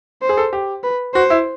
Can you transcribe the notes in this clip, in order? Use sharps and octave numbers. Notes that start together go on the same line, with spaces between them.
C5
G#4
A4
G4
B4
F#4 C5
E4